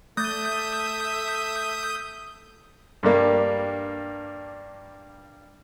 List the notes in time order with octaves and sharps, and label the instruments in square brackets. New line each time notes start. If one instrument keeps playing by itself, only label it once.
[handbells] A3 A6 [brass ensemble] A4 E5 [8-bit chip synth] D#6 G6
[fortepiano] G2 G3 A#3 D4